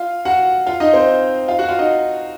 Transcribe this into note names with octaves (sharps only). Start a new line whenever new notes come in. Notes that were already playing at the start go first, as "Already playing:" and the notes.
Already playing: F4 F5
F#4 F#5
F4 F5
D#4 D#5
C4 C5
F4 F5
F#4 F#5
F4 F5
D#4 D#5